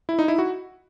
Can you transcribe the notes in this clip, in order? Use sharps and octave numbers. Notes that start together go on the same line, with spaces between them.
E4
D#4
E4
F#4